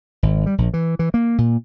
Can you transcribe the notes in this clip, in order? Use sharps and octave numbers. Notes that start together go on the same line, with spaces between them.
G#1
G3
A#1
E3
E3
A#3
A#2